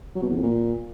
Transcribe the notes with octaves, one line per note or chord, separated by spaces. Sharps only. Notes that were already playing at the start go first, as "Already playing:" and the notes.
F#3
B2
E2
F2
A#2